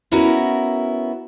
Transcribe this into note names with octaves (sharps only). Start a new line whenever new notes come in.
B3 C#4 E4 F#4 A#4